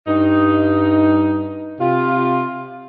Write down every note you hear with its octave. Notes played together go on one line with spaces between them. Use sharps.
G2 D#4
C3 F4